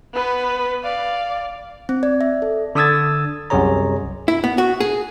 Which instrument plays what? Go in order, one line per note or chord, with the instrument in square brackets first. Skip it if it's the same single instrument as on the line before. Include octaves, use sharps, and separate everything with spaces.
[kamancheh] B3 B4
D5 F5
[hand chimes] C4
D5
E5
A4
[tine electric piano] D3 D4 D#6 E6 G#6 A6
C2 F#2 C3 G#4 C#5 A#5
[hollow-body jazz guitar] E4
B3
F#4
G#4